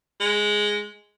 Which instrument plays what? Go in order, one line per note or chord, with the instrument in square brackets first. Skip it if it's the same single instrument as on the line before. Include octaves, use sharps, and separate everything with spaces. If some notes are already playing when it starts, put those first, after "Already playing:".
[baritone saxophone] G#3